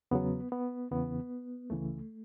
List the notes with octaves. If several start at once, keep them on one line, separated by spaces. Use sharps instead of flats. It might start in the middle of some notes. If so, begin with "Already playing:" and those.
E2 C#3 F#3 B3
B3
E2 C#3 E3 B3
C#2 C#3 E3 A3